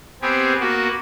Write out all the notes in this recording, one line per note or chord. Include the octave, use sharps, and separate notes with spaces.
B3 C4 G4 G#4
A#3 B3 F#4